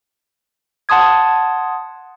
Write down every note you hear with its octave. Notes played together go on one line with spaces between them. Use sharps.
F#5 A5 C6 D#6 G#6